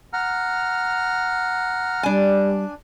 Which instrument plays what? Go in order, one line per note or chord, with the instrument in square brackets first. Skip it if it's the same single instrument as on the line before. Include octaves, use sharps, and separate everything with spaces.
[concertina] F#5 A#5 F6
[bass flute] G3 [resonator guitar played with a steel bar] D4 G#5